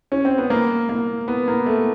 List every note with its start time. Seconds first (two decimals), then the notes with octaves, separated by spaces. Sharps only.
0.12 C#4
0.25 C4
0.38 B3
0.50 A#3
0.89 A#3
1.28 B3
1.48 A#3
1.66 A3